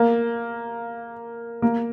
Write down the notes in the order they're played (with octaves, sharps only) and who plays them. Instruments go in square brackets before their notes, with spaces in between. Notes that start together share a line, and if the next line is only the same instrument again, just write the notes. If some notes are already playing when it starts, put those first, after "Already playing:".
Already playing: [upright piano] A#3
A#3